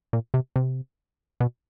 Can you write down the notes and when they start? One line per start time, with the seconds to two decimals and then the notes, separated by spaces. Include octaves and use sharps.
0.13 A#2
0.34 C3
0.56 C3
1.40 B2